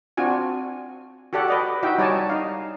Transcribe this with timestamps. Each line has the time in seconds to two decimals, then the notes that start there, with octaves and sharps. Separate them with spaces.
0.17 C4 D4 F4 F#4 G#5
1.33 F#4 G4 A4 D5 F#5
1.48 B4 D5 D#5
1.83 D#4 E4 F#4 E5 F#5 G5
1.98 G3 D#4 C#5 D5 G#5 A5
2.29 D#4 F5